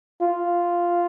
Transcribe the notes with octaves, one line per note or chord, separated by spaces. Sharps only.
F4